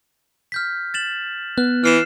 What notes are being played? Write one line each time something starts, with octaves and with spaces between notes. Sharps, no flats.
F6 G6 B6
A6 E7 F#7
B3 F#6
E3 F6 C7 E7